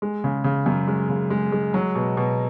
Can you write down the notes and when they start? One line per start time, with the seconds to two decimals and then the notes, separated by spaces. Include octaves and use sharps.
0.02 G#3
0.24 C#3
0.44 C#3
0.66 F#2
0.88 G#3
1.09 C#3
1.30 G#3
1.52 G#3
1.74 F#3
1.95 B2
2.17 B2